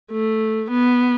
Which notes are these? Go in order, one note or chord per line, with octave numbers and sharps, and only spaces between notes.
A3
B3